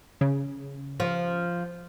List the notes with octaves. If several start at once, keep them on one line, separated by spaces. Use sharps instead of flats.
C#3
F3